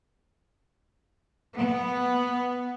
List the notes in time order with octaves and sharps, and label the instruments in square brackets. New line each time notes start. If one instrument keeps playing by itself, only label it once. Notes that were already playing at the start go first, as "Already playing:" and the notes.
[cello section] B3